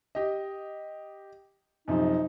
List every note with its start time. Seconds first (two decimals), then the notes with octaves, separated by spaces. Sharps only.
0.15 G4 D#5
1.88 F#2 C3 F3 D#4